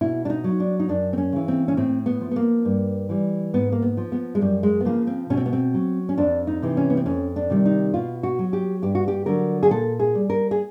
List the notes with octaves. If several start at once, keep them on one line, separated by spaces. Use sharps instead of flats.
B2 E4
D4
D#4
F#3
D4
D#4
F#2 D4
C4
C#4
C#3 E3
C4
C#4
A2 C4
B3
F3
B3
A#3
G2
E3 G3
G#2 B3
A#3
B3
F3
B3
G#3
F#2 G3
G#3
B3
C#3 F3 A#3
C4
B2 C#4
C4
B3
C4
F#3
C#4
F2 D4
D#4
C3 E3
C#4
B3
C4
F2 C#4
D4
C3 D#3 G3
D#4
B2 F4
F#4
F#3
G4
G2 G4
F#4
G4
D3 F#3 A#4
G#4
A#2 A4
G#4
G3
A#4
G#4